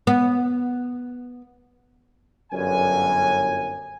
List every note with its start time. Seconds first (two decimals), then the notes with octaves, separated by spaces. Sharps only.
0.07 B3
2.53 G1 F#2 G#5